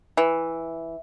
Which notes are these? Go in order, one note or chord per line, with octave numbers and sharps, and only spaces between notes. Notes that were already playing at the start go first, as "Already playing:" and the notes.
E3